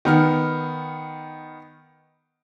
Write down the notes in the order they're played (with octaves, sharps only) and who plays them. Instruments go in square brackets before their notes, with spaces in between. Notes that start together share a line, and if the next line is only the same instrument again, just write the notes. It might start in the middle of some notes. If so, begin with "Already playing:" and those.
[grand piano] D#3 B3 F6